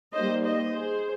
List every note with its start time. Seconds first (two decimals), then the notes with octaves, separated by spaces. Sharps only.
0.13 G3 A#3 D#4 C5 D#5
0.43 C5 D#5
0.72 G#4 C5